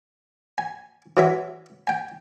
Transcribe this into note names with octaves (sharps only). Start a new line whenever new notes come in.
G#5
E3 F#3 E5
G5 G#5